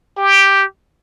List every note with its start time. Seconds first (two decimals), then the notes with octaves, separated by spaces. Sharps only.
0.17 G4